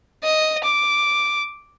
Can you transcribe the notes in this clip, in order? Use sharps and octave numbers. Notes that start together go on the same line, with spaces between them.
D#5
D6